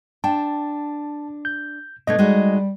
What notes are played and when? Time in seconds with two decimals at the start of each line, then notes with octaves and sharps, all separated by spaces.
0.24 D4 G5 A5
1.45 G6
2.07 B2 A3 D4 D#5 G#6
2.19 G3 G#3 D#4 F#4